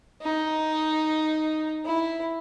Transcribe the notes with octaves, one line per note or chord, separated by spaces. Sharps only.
D#4
E4